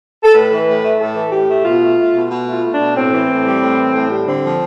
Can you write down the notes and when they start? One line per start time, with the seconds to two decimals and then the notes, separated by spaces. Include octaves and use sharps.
0.23 A4
0.33 A2 B4
0.50 E3
0.66 A2
0.83 A3
0.99 A2 A4
1.15 E3
1.32 A2 G4
1.48 A3
1.65 B2 F4
1.81 A3
1.97 A3
2.14 B2
2.30 B2
2.47 A3
2.52 F4
2.63 A3
2.74 D4
2.79 B2
2.96 A2 C4
3.12 E3
3.29 A2
3.45 G3
3.61 A2
3.78 E3
3.94 A2
4.10 G3
4.27 D3 C4
4.44 F3